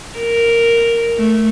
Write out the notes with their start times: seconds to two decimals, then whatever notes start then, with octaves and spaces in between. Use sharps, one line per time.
0.18 A#4
1.18 A3